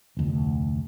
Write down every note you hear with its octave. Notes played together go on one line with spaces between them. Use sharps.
F1 D2